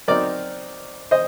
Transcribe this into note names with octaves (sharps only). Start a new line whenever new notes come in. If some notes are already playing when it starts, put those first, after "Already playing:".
F#3 C4 D#4 A#4 D5
C5 D#5